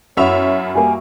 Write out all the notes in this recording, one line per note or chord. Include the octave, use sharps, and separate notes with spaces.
F#2 B3 E4 F#4 C#5 E5 F7
G3 A#3 G#5